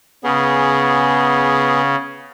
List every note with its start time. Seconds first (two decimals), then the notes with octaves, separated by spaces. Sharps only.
0.24 C#3 B3 G#4